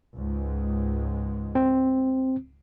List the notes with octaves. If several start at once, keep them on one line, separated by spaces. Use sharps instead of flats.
C#2 G#2 G#3
C4